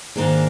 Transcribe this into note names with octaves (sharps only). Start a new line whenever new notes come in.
G#2 D#3 A#3 D4 G#4